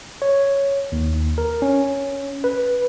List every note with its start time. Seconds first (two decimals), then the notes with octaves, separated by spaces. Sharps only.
0.22 C#5
0.92 D#2
1.38 A#4
1.62 C#4
2.44 B4